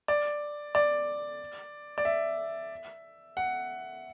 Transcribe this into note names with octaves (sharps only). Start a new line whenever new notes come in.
D5
D5
D5
E5
F#5